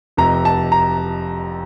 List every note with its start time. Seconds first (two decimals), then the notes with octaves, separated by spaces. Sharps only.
0.17 F1 F2 C3 A#5
0.45 A5
0.72 A#5